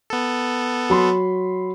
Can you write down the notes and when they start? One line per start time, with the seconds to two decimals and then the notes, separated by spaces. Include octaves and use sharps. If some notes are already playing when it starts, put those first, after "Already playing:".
0.10 B3 A4
0.90 F#3 B5 C6